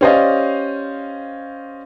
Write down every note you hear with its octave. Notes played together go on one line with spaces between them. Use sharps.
C#4 G4 C5 D5 D#5 F5